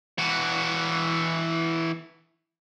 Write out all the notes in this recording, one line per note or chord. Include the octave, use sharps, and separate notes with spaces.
E3 F#4